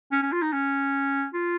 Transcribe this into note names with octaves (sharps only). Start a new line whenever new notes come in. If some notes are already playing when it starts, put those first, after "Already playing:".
C#4
C#4
F4
D#4
C#4
F4